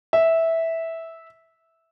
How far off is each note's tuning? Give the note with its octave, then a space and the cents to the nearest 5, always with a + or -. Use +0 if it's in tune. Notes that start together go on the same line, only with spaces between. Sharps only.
E5 -10